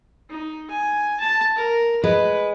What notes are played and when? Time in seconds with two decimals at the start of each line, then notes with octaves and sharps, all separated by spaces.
0.30 D#4
0.70 G#5
1.20 A5
1.56 A#4
2.04 G#3 B4